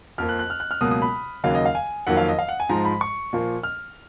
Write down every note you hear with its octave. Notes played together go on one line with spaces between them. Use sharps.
F2 F3 A#3 F6
F#6
F#6
F6
F#6
F6
C#2 B2 F#3 A#3 D#6
D#6
B5
D#2 C#3 F#3 A#3 F5
D#5
F5
G#5
F2 D#3 F#3 A#3 F#5
F5
D#5
F5
F#5
G#5
G#2 F3 G#3 A#5
B5
C#6
A#2 F3 A#3
F6